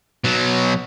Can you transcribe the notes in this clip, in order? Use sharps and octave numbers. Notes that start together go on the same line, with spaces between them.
B2 F#3